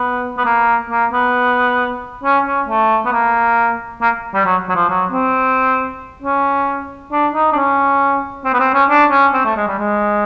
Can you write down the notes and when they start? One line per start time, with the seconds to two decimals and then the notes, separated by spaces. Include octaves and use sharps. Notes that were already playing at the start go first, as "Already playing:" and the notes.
Already playing: B3
0.38 B3
0.45 A#3
0.90 A#3
1.13 B3
2.24 C#4
2.46 C#4
2.67 A3
3.05 B3
3.12 A#3
4.01 A#3
4.34 G3
4.46 F#3
4.69 F#3
4.75 F3
4.89 F#3
5.11 C4
6.22 C#4
7.12 D4
7.33 D#4
7.52 D4
7.55 C#4
8.45 C4
8.54 B3
8.60 C4
8.74 C#4
8.90 D4
9.11 C#4
9.34 C4
9.45 A3
9.56 G#3
9.67 G3
9.78 G#3